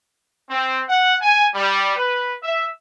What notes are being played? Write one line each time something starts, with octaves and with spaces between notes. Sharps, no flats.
C4
F#5
G#5
G3
B4
E5